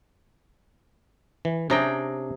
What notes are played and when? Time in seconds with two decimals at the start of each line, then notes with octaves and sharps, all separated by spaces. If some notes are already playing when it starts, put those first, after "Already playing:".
1.45 E3
1.70 C3 C#4 D4 G#4 G5 A#5